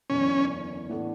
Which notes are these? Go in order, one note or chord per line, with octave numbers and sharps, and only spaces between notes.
F#1 E2 D3 C#4
A2 E3 B3 D4 A4